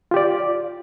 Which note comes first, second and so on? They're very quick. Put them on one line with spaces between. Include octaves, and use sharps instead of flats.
F4 G4 D5